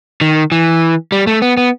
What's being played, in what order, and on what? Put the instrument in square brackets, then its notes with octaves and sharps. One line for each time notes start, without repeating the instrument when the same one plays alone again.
[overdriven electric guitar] D#3
E3
G3
A3
B3
B3